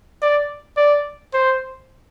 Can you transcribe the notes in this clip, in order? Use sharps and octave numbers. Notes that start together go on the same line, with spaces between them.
D5
D5
C5